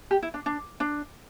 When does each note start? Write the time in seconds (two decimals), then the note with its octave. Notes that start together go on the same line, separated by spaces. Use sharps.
0.11 G4
0.22 E4
0.34 D4
0.46 D4
0.80 D4